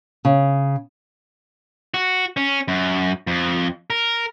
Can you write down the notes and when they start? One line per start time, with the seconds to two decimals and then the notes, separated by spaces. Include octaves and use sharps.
0.25 C#3
1.94 F#4
2.37 C#4
2.68 F#2
3.27 F2
3.90 A#4